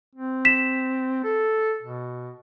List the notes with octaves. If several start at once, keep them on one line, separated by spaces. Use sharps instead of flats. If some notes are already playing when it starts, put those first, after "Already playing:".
C4
B6 E7
A4
B2